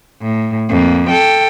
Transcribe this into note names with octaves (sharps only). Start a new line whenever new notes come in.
A2
F2 A#3
A4 G5